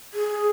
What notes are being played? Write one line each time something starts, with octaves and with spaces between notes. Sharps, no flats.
G#4